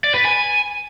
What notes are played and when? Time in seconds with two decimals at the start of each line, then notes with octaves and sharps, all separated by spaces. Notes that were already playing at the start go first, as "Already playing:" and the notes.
0.04 D5
0.14 B4
0.25 G#5